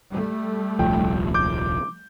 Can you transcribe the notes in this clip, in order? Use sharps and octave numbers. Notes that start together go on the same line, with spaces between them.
G3 A3
D#1 C2 F3 G5
D6 G6